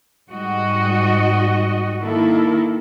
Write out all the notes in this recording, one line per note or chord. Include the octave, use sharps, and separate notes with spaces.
G#2 G3 F#4 D#5
D#3 A#3 E4 A4 A#4